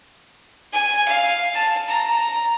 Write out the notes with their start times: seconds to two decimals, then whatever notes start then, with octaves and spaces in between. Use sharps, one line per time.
0.73 G#5
1.08 F5
1.54 A5
1.88 A#5